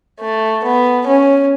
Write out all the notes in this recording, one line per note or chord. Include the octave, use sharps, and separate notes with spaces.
A3
B3
C#4